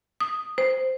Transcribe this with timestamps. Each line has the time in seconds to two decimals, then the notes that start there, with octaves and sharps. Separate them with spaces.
0.21 D#6
0.58 C5